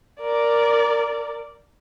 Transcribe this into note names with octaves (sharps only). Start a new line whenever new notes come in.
A#4 D5